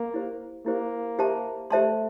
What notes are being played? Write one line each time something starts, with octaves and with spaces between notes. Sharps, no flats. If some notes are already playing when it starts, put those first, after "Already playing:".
Already playing: A#3
E4 G4 C5
A#3 E4 G4 C5
G4 C5 E5 A5 C6
A3 G4 C5 E5 A5 C6